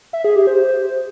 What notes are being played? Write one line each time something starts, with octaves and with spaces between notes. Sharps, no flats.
E5
G#4
G4
C5